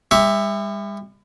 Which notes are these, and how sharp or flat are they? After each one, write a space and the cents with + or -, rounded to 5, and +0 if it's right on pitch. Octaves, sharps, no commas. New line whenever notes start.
G3 +45 E5 +0 C#6 +10